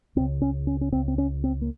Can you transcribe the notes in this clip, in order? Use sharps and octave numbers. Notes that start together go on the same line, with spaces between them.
C#2 C#3 C4
C#4
C#4
C#4
C#2 C#3 C4
C4
C#4
C4
A#3